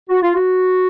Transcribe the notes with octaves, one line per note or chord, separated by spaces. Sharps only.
F#4
F4
F#4